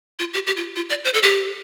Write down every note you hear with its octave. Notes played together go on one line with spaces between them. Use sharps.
F4
G4
G4
F4
F4
D5
C5
A4
G4